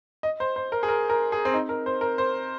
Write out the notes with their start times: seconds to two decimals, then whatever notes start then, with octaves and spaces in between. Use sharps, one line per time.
0.23 D#5
0.40 C5
0.56 C5
0.72 A#4
0.83 G#4
0.88 A#4
1.10 A#4
1.32 G#4
1.45 C4
1.54 D#4
1.69 A#4
1.86 C5
2.01 A#4
2.18 C5